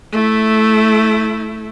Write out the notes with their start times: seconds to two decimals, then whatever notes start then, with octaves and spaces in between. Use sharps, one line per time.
0.12 A3 E4